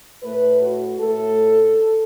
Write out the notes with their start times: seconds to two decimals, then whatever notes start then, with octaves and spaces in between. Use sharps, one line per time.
0.23 A2 A3 B4
0.62 F#4
1.01 A2 A3 A4